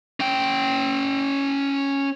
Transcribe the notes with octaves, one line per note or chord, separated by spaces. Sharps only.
C#4 G5